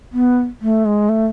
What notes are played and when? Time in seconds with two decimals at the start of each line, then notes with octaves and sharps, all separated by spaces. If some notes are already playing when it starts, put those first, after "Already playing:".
0.13 B3
0.61 A3
0.85 G#3
1.09 A3